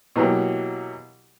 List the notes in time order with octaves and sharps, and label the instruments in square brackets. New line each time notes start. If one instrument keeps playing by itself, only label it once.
[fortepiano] B2 E3 F#3 A#3 G4